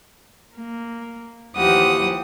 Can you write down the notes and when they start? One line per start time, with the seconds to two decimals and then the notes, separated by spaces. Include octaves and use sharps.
0.56 A#3
1.57 D#2 E3 F3 G4 F#5 D#6